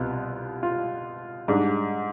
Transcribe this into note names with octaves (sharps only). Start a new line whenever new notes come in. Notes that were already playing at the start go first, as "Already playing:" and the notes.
Already playing: C2 B2 B3 F4
F4
G#2 G3 D4